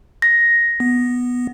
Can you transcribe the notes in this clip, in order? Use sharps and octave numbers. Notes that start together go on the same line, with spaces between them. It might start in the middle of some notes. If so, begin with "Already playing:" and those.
A#6
B3